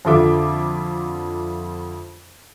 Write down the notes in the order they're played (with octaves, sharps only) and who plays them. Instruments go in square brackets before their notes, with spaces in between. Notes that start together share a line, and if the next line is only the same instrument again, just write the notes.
[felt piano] F2 D3 F4 A4 E5 D6